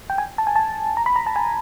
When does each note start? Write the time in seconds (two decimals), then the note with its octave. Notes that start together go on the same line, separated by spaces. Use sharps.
0.10 G5
0.18 G#5
0.38 A5
0.47 G#5
0.56 A5
0.97 A#5
1.06 B5
1.16 A#5
1.26 A5
1.36 G#5